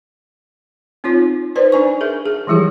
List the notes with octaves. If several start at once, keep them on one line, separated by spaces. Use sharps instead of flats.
C4 D#4 F4 C#5
D#4 B4 C5 D5
D4 G#5 C#6
G#4 A#4 E5
G#4
E3 F3 G3 E4 G4